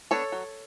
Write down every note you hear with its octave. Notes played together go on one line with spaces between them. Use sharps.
B3 D4 A4 C#5
F#3